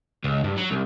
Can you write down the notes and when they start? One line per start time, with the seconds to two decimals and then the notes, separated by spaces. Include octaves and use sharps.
0.24 C#2
0.44 G2
0.58 F#3
0.71 C2